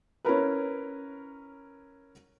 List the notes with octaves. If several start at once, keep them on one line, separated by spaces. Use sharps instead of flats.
C#4 E4 A#4 B4